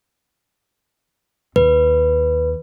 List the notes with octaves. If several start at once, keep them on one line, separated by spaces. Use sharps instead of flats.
D#2 B4